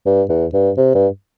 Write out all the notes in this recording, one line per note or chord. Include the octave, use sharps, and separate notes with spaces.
G2
E2
G2
C3
G2